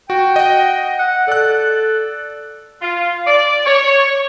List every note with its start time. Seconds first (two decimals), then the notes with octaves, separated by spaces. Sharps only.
0.10 F#4 G5
0.36 D#5 F#5
0.99 F#5
1.28 A4 D5 F#6
2.82 F4
3.27 D5
3.66 C#5